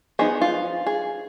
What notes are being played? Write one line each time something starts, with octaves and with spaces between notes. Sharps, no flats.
F3 B3 D#4 G#4
F4
G#4